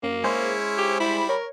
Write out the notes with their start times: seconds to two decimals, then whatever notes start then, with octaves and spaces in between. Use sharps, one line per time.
0.03 F#2 A#3
0.24 G#3 C#4 E4 G#4 C5
0.78 G4
1.00 G3 E4 B5
1.29 A#4 C#5